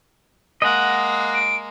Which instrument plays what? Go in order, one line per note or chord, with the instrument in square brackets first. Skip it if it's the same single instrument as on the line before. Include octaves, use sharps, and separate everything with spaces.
[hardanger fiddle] G#3 A#3 [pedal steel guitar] D#5 F#5 [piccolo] D#6
[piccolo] D7